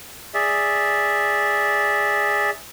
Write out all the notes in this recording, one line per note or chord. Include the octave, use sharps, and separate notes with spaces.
G#4 D5 E5